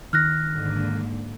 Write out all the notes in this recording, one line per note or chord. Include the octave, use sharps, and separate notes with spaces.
D#3 F6 F#6 A#6
G#2 D3 A#3